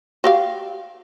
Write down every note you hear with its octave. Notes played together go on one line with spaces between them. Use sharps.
F#4 G4 F5